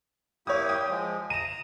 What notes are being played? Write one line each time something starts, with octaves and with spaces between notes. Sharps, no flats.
A#3 E4 G4 C#5 D#6
G5 D#6
F3 G#3
A#5 D#7 E7